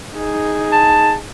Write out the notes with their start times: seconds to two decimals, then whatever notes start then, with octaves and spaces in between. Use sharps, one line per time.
0.16 D#4 G#4
0.72 A5